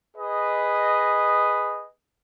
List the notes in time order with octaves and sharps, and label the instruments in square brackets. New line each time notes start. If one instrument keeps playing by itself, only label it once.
[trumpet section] G#4 B4 D#5